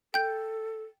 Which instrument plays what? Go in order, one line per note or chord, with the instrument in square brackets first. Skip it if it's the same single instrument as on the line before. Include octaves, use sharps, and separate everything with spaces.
[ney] A4 [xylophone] G5 G6